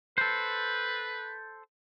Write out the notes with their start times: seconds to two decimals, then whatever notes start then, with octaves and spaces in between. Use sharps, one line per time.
0.18 A4 B4 C5